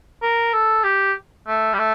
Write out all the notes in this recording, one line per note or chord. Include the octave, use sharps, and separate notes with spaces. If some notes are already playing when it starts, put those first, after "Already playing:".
A#4
A4
G4
A3
G3
A3